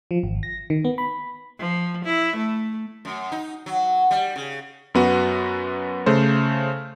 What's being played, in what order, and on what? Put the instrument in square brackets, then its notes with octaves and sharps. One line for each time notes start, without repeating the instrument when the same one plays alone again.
[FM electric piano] F3
G#1
A#6
D#3
B3
B5
[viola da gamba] F3
E4
A3
[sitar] F#2
D#4
F#3
G3
C#3
[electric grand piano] F#2 B3 F#4
C#3 A3 C5